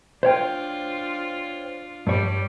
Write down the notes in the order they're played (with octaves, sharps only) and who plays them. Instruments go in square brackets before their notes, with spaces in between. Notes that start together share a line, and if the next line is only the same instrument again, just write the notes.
[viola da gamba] D4 F4 [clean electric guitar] C5 C#5 G5
[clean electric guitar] G2 C#5 [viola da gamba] G3